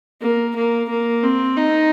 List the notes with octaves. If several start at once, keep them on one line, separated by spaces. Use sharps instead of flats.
A#3
A#3
A#3
C4
D#4